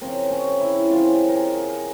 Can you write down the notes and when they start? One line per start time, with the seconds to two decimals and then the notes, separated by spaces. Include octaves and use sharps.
0.01 C#3 F3 C4 A#4
0.31 C#4
0.61 E4
0.91 C#3 F3 C4 F4
1.13 G4
1.29 A#4
1.35 G#4
1.57 A#4